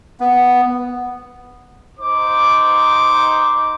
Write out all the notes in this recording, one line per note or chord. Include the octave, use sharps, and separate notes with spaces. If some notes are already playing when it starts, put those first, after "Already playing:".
B3
D#4 C5 D6